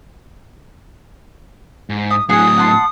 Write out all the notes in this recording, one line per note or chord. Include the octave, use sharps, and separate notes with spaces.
G#2
D#6
A2 F#3 G#4 F#5 G#5 D#6
F#5 A5 C6